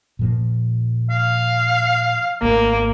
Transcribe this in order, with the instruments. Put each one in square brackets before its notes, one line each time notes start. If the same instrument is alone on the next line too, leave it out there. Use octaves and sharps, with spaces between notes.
[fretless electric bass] A#2 F3 A#3
[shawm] F5
[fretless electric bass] G#1 A3 [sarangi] A#3